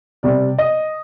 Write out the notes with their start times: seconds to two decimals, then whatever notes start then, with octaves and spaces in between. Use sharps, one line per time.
0.23 C3 G3 D5
0.58 D#5